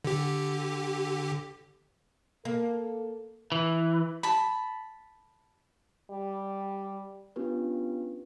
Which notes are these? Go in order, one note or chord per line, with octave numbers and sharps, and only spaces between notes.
D3 G4
A#3 A4
E3
A5 B5
G3
B3 C#4 D4 F4 G4 B4